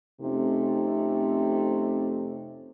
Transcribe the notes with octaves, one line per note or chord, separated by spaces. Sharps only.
F2 C3 A3 C4 C#4 D#4